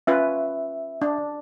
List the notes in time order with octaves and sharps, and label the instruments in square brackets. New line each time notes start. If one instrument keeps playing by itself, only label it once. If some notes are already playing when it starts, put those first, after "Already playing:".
[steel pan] C#4 F4 B4 [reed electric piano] E5
[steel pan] D4